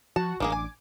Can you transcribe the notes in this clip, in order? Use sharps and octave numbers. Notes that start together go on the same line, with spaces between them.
F3 F#4 A5
A1 D#3 A#3 D4 G#4 D6
G#5